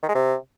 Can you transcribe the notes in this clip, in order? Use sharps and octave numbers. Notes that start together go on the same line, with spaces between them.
D#3
G#3
C3